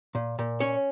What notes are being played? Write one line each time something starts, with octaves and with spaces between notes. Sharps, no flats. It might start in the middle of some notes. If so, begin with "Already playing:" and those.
A#2
A#2
C#4 C#5